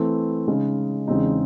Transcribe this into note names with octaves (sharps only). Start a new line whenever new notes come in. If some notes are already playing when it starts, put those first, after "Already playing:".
Already playing: E3 A3 C4
C#3 G#3 D#4
E2 C#3 G#3 C4 D#4